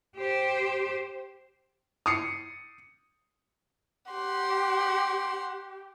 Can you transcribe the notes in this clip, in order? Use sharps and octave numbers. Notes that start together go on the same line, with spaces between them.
G4 C5
D#6 C7 C#7
G4 F#5 C6